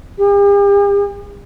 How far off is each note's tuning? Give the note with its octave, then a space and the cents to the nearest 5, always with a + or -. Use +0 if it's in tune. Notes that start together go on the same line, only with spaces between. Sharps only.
G4 +45